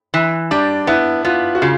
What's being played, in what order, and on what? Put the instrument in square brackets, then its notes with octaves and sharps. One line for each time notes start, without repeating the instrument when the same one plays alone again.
[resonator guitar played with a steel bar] E3
[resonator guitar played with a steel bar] G3 [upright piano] D4
[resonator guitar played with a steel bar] B3 [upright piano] E4
[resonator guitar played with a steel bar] B3 [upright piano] F4
[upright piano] F#4
[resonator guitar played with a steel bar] C#3 [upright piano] F4